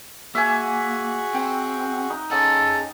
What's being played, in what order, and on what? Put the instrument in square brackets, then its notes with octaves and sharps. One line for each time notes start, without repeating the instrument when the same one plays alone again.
[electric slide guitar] A#3 [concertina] F#4 G#4 F#5 [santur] E5 G#5
[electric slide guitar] C4 [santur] G5
[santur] D#4
[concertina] C#4 D#5 [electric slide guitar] G#4 F#5 [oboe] A4